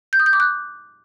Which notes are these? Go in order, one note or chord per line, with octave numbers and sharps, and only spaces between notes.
G6
D#6
G6
D6
F#6